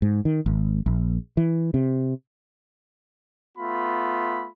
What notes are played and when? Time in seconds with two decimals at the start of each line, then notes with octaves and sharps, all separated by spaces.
0.02 G#2
0.25 D#3
0.46 G#1
0.86 A#1
1.37 E3
1.74 C3
3.58 A3 B3 F4 B5